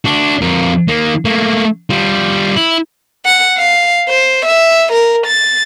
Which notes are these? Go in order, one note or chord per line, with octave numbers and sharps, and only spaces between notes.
D4 F#4
F2 A#4
D#3 A#3
A3 A#3
G3 F4
E4
F#5
F5
C5
E5
A#4
A6